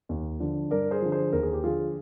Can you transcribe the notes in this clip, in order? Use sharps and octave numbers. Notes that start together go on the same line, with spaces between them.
D#2
D3 F3
G2 A#4 D5
G#4 C5
D3 F3
G#4 C5
D#2 A#4
G#4
G4
D3 F3 F4 G#4